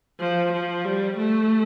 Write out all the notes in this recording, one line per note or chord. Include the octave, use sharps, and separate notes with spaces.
F3
F3
G3
A3